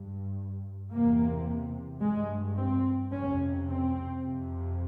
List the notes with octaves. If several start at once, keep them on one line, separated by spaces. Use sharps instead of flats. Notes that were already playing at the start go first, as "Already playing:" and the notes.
Already playing: G2
E2 C3 A#3
G2 G#3
C4
F2 C3 C#4
C4
F2 C3